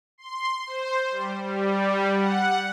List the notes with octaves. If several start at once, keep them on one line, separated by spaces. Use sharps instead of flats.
C6
C5
G3
G3
F#5